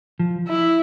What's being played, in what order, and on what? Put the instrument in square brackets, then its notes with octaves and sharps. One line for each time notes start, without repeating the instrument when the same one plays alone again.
[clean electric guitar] F3
[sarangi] E4